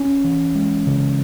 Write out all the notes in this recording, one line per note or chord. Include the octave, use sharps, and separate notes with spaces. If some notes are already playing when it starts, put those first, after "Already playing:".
Already playing: C#4
E3
G#3
C#3